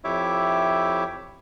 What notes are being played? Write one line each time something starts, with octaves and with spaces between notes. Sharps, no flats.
F2 E4 G4 C#5 E5 D6